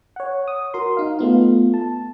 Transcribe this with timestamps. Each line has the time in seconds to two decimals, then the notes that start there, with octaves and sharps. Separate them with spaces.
0.16 C#5 F#5
0.48 D#6
0.74 F#4 A#4 C6
0.97 D#4 F5
1.19 A3 B3 F4
1.74 A5